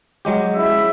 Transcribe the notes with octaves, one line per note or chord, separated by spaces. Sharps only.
F#3 G#3 G4
C#3 E4 E5